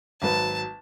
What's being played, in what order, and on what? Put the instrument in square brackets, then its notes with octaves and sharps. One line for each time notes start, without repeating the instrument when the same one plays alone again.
[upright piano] G#1 F#3 B4 [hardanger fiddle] A5